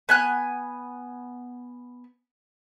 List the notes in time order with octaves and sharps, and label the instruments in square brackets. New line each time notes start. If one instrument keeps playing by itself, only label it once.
[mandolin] B3 G#5 F#6